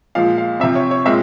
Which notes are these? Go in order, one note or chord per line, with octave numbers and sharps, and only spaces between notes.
A#2 F3 G#3 F5
F5
C3 F3 C4 E5
C#5
C#5
A#2 G#3 C4 E5